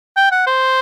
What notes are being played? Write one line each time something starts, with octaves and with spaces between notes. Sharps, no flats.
G5
F#5
C5